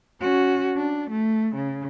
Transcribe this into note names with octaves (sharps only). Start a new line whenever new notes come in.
C#4 F#4
D4
A3
C#3